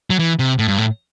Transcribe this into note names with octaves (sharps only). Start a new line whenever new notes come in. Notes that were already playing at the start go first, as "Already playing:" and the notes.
F#3
E3
C3
A2
G2
A2